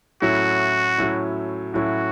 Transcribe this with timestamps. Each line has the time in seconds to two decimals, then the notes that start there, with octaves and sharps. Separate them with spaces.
0.22 A2 F#3 A3 C#4 E4 F#4
0.98 A2 F#3 A3 C#4 E4
1.74 A2 F#3 A3 C#4 E4 F#4